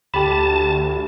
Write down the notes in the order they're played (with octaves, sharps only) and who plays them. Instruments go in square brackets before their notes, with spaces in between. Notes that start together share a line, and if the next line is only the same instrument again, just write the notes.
[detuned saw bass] D2 [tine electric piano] G4 B5 [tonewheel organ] A5